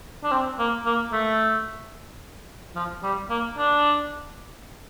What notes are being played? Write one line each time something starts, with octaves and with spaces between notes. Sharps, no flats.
D4
C4
A#3
A#3
A3
F3
G3
A#3
D4